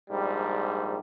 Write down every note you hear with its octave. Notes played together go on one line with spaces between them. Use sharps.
A#1 G#2 G3